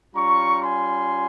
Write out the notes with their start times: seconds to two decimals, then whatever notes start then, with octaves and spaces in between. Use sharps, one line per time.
0.15 G3 C#4 F4 A#5 C#6
0.62 G#5 C6